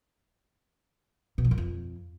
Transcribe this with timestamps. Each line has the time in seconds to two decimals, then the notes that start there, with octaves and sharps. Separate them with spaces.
1.38 B2
1.45 F3
1.51 F#2
1.58 F2